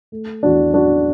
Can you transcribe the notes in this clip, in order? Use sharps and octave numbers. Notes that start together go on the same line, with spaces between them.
A3
E2 D4 F#4
F#3 D4 F#4